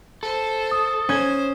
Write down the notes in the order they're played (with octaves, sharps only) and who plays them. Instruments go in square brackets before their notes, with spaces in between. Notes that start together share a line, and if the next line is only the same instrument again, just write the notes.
[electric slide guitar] A4 [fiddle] C5
[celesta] D#6
[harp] C#4 G#6 [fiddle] C5